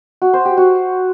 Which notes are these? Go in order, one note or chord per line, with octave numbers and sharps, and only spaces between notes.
F#4
C5
G4
F#4